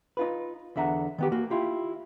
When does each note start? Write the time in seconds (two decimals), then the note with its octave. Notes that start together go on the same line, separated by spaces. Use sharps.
0.17 D#4 F4 B4
0.76 E2 D3 E5 F#5 A#5
1.18 D#3 B3 G4
1.32 A#3 F#4
1.50 E4 F4 G4